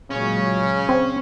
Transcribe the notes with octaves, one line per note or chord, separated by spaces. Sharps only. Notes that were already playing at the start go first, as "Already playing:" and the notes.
A#2 C#3 F#3 G#3 C#4
C4 C5